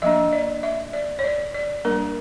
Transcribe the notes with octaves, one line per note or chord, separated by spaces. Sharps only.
F3 A#3 D4 E5
D5
E5
D5
C#5
D5
D5
G3 A#3 D4 A#4